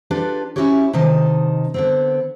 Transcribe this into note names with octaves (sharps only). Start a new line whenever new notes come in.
D4 F4 G4 A4 B4 D5
C#4 D#4 E4 F#4 G4 C#5
C3 D#3 D#4 A5
D3 B3 C4